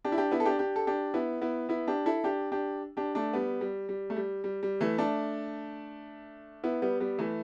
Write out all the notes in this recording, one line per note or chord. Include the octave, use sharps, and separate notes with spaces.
D4 G4
E4
D4 G4
B3 E4
A4
D4 G4
D4 G4
A4
D4 G4
B3 E4
B3 E4
B3 E4
D4 G4
E4 A4
D4 G4
D4 G4
D4 G4
A3 D4
G3 B3
G3
G3
A3
G3
G3
G3
E3 A3
A3 D4
B3 E4
G3 B3
G3 B3
E3 A3